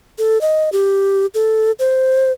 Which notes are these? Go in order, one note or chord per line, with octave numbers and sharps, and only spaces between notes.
A4
D#5
G4
A4
C5